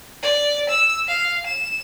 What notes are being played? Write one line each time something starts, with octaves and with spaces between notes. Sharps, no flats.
D5
E6
F5
E7